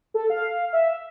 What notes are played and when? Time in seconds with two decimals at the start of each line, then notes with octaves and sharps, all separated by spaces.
0.14 A4
0.30 F5
0.73 E5